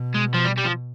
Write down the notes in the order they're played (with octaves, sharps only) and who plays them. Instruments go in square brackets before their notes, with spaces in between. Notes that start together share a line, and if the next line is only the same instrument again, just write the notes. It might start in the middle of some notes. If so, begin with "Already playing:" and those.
Already playing: [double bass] B2
[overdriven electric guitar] G#3
F3
G3
G3
F3